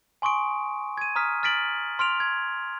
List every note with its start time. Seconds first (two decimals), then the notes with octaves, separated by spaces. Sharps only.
0.22 G#5 C6 C#6 D#6 D7
0.97 G#6 D#7
1.16 A#5 D#6 F6 B6
1.43 F6 A6 B6 D7 F#7
1.99 C6 F6 D7 F7
2.20 G#6